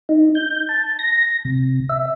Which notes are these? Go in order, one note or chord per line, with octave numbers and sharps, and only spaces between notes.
D#4
G6
A5
A#6
C3
E5